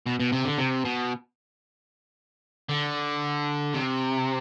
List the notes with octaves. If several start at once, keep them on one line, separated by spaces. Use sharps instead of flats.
B2
B2
C3
D3
C3
B2
D3
C3